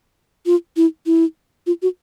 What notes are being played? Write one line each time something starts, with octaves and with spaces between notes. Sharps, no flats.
F4
E4
E4
F4
F#4